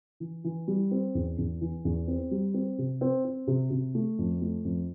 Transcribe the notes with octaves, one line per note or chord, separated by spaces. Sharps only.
E3
E3
G3
C4
E2
E2
E3
E2
C4
G3
C4
C3
C4
C4
C3
C3
A3
F2
A3
F2